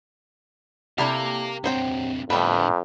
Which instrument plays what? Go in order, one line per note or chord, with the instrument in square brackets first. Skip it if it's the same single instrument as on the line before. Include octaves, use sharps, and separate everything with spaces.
[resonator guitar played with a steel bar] C3 G4 [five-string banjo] D4 E4 A4 [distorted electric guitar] A#4 F5
[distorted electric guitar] D3 C4 [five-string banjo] F#3 C5 G5
[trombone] F2 [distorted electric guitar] A2 D4 [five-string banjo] G3 B4 [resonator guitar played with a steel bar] A3 B3